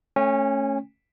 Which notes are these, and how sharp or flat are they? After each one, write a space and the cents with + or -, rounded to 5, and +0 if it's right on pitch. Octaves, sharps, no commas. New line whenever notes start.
A3 +0 C#4 -10 G#5 -45